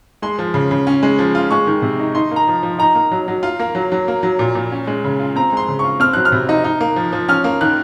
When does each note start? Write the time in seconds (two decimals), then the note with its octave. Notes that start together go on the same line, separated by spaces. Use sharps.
0.22 G#3 C6
0.39 F3
0.54 C#3
0.71 C#3
0.87 C#4
1.03 G#3
1.19 F3
1.35 F4
1.50 G#3 C#6
1.67 D#3
1.82 C3
1.99 D#4
2.15 D#4 C6
2.31 A#3
2.36 A#5
2.48 F3
2.63 F3
2.79 D#4 A#5
2.95 A#3
3.11 F#3
3.28 F#3
3.43 F4
3.60 A#3
3.75 F#3
3.92 F#3
4.08 A#3
4.23 F#3
4.39 A#2
4.55 A#2
4.72 C#4
4.87 G#3
5.04 C#3
5.20 F4
5.36 C4 A#5
5.52 G#3 C6
5.69 C#3
5.79 F4 C#6
6.00 C4 F6
6.13 F#3 F#6
6.25 F6
6.32 C3
6.49 D#4
6.64 D#4
6.81 A#3
6.96 F3
7.13 F3
7.29 C#4 F6
7.44 A#3
7.61 D#3 F#6